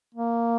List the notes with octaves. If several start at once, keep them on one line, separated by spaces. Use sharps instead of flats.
A#3